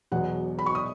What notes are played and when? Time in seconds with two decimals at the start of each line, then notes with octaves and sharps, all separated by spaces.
0.12 E1 E2 B2 F#3 F#5
0.59 B5
0.66 C#6
0.75 D#6